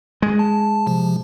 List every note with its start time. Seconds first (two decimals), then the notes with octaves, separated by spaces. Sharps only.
0.22 G#3
0.39 A5
0.87 C3 F3